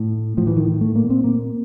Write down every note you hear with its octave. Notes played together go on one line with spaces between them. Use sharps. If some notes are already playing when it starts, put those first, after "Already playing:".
Already playing: A2
A2 F3
E3
D#3
A3
A#2 A#3
C4
A#3